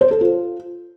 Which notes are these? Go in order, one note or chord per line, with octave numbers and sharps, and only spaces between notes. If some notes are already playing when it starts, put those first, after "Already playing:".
C5
A4
F4